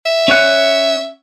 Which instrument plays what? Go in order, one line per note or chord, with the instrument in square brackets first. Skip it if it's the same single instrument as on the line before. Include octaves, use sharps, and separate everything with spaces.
[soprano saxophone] E5
[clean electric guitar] C#4 C#5 F#5